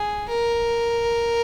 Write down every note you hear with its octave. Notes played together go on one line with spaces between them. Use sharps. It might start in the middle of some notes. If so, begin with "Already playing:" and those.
Already playing: G#4
A#4